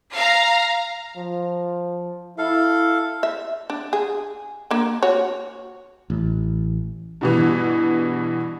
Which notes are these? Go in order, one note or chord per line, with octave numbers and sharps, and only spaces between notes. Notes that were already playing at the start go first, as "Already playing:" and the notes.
F5 A#5
F3
E4 A4 F5
E5
D4
G#4
A#3 D4
F#4 C#5
A1
G2 B2 E3